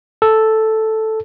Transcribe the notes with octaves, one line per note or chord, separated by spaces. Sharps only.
A4